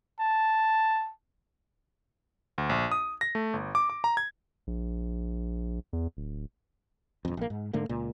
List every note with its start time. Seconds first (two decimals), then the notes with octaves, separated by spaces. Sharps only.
0.20 A5
2.58 D2
2.69 A#1
2.92 D#6
3.21 A#6
3.35 A3
3.53 G1
3.75 D6
3.90 D6
4.04 A#5
4.17 G#6
4.67 A#1
5.93 E2
6.17 D1
7.25 E1 F2
7.37 A#1 A#3
7.50 G#2
7.73 G#2 D3 A3 A#3
7.89 C#2 A#2